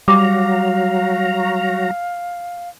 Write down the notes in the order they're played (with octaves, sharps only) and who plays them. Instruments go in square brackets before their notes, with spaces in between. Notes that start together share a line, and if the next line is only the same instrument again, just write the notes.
[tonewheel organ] F#3 F#4 A#5 [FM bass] G3 [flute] F5 [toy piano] D6